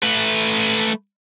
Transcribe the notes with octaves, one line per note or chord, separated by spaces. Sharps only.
A3 B4